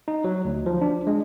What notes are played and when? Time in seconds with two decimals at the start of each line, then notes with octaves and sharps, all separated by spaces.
0.08 D#4
0.24 F#3
0.45 D2
0.66 F3
0.81 D4
1.07 G#3